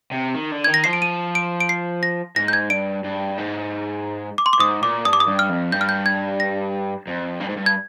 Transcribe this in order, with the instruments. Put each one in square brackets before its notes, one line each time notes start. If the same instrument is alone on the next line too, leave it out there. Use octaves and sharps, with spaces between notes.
[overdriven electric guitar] C3
D#3
D3
[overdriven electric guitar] D#3 [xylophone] G#6
[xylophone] A#6
[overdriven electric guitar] F3 [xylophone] C7
[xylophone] D7
D#7
D7
D7
C7
A#6
[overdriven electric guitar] G#2 [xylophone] A#6
[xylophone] G6
G#6
[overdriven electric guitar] G2 [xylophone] D7
[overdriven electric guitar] G2
G#2
[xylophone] D6
C6
D6
[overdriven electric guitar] G#2 [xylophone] D#6
[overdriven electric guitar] A#2 [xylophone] D6
[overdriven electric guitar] G2 [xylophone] D#6
[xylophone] D6
D#6
[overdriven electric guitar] G2
[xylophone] F6
[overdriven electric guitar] F2
[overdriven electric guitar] G2 [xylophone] G6
[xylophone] F6
G6
G#6
A#6
[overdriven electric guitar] F2
G2
G#2
G2
[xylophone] G#6